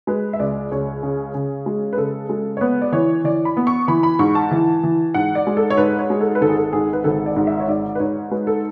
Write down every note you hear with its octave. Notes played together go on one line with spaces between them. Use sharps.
G#3 B4
E5
C#2 D5
C#2 C#5
C#3
C#3
G#3
B4
C#3 A4
G#3
C#5
B3 B4
D5
E3 C#5
E3 D5
B5
B3
C#6
E3 B5
B5
G#2 C#6
A5
E3
E3
G#2 F#5
D5
G#3
A4
C#5
G#2 B4
C#5
G#3
A4
B4
G#1 A4
G#4
A4
G#2 G#4
B4
G#1 A4
D5
G#2
E5
C#5
G#2 D5
B4
G#2 C#5
G#3 B4
A4